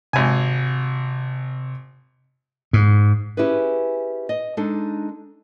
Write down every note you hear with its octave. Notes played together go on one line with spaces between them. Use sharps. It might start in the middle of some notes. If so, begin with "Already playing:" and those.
G#1 C3 G#5
G#2
C#4 E4 G4 G#4 B4
D#5
G#3 D4 D#4 A4